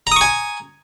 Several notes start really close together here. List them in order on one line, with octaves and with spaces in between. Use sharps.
A#5 D#6 C#6 G#5